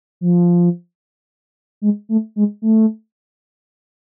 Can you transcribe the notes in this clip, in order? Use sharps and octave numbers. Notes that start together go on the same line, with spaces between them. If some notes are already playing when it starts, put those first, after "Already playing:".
F3
G#3
A3
G#3
A3